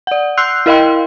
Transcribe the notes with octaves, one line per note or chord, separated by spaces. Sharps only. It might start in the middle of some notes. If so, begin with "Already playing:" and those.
D5 F#5
C6 E6 F#6 G6 C7
E4 A#4 D#5 F5 G5 C6